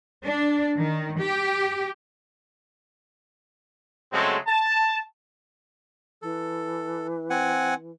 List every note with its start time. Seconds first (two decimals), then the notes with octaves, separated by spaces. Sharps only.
0.24 D4
0.77 D#3
1.20 G4
4.12 C#3 F#3 G#3 A3 C4
4.47 A5
6.22 E3 A4
7.30 C4 F#5 G#5